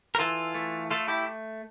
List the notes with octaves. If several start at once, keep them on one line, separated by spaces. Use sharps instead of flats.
A#4
E3 F4 A4
A3
A3 F4 A4
E4 G4